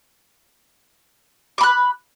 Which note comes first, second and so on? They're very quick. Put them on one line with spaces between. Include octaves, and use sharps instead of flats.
D6 B5 F#6